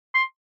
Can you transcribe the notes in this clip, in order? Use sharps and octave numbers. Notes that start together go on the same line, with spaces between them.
C6